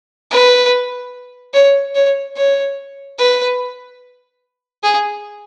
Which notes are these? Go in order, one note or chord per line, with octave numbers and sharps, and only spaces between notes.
B4
C#5
C#5
C#5
B4
G#4